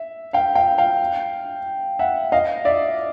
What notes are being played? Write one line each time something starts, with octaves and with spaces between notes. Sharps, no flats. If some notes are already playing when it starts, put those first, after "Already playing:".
Already playing: E5
F5 G5
F5 G5
F5 G5
E5 F#5
D#5 F5
D5 E5